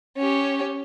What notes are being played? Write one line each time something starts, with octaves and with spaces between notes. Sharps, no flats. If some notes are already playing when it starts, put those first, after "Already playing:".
C#4 G4